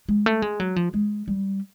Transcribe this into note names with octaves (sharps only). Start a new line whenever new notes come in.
G#3
A3
G#3
F#3
F3
G#3
G3